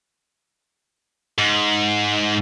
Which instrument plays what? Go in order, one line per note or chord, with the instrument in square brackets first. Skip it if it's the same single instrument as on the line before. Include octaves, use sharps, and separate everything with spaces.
[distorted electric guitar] G#2